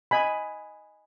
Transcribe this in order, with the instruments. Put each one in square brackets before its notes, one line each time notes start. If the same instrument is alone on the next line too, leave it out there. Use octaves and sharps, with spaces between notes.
[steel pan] D#5 G#5 B5